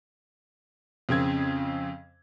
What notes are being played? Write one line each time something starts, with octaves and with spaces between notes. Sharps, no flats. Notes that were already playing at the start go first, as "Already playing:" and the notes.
F2 C#3 C4 G#6